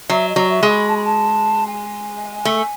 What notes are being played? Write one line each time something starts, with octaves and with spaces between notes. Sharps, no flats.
F#3 E5
D#5
F#3
E5
G#3
B5
A5
B5
A5
G#5
A3